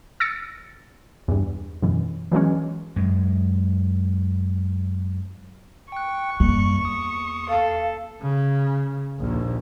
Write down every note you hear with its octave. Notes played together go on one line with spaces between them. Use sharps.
E6 A6 A#6 C#7
E2 G2
F#2 B2 E3
E3 F#3 G#3 C#4
F#2 G#3
G5 C#6 F#6
F#2 G3 A#3
E2 D#6
A4 F5
C#3
A#1 D#2